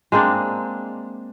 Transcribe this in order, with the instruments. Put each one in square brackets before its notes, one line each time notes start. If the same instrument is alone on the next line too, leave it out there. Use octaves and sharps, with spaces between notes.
[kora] G#3 A#3 C4 D4